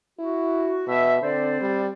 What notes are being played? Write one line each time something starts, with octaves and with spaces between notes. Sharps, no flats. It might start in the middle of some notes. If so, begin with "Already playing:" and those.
E4 F#4
B2 E5
D3 C4 C5 D5
G3